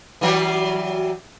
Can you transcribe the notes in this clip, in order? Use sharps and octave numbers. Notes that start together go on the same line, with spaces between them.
E3 F#3 G3